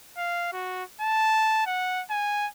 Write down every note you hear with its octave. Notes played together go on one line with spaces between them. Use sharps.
F5
F#4
A5
F#5
G#5